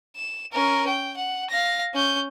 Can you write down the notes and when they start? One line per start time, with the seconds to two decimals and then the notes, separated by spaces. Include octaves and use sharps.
0.16 E7
0.51 C#4 A#4
0.87 G5
1.16 F#5
1.49 F5 A#6
1.94 C#4 G6